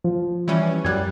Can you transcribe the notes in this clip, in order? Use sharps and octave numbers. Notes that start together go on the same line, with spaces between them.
F3
E3 G3 C#4
F#2 G3 F#6 G#6